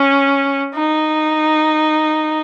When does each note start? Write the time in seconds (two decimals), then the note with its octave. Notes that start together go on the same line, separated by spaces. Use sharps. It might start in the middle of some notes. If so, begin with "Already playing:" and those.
Already playing: C#4
0.75 D#4